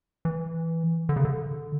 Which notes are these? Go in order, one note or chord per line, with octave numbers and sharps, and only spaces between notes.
E3
D3
C#3
D3